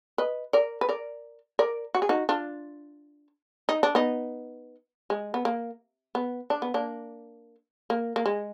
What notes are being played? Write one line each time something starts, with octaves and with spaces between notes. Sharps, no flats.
B4 D#5
A#4 D5
B4
A#4 D5
A#4 D5
F#4
G#4
D#4 F#4
D4 F4
D#4
D4
B3 D#4
G#3
B3
A#3
B3
D4
B3
A#3 D4
A#3
A#3
G#3